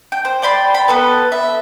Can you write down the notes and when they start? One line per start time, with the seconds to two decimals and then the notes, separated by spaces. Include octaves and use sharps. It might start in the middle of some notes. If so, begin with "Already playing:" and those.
0.12 G5
0.25 C5
0.42 D5 G5 B5 C6
0.74 B5
0.88 B3 A4 B4
1.32 E5